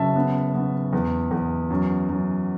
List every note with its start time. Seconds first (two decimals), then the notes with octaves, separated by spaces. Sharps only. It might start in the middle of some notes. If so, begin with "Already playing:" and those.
Already playing: F#1 F#2 E5 A5
0.16 B3
0.55 B3
0.93 E2
1.31 E2
1.70 F#2
2.09 F#2